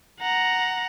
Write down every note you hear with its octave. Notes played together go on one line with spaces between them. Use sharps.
F#5 A#5